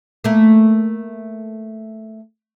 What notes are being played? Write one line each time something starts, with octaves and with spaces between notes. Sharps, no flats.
A3 A#3